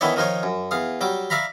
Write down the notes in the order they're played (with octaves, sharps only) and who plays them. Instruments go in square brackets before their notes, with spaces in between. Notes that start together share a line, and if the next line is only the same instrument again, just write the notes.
[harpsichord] D#3 E3 B3 E4 C#5 D5
D#3 F3 D#4 F4 C#5
F#2
E2 F5 D#6
F#3 G3 D6
D5 E5 F5 A#5 B5